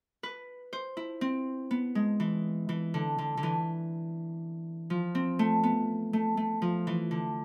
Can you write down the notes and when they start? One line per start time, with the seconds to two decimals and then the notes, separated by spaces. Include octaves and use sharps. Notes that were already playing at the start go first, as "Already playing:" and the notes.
0.23 B4
0.73 C5
0.97 E4
1.21 C4
1.71 B3
1.95 G#3
2.20 E3
2.69 E3
2.94 D3
3.18 D3
3.37 D3
3.43 E3
4.90 F3
5.15 C4
5.39 A3
5.63 B3
6.13 A3
6.37 A3
6.62 F3
6.87 E3
7.11 D3